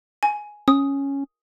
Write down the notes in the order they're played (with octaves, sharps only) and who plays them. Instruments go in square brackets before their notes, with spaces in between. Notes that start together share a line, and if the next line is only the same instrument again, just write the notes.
[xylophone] G#5
[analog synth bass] C#4 [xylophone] D#6